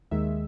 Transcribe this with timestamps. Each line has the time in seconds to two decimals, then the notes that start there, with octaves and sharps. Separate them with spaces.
0.11 D#2 D#3 G#3 E5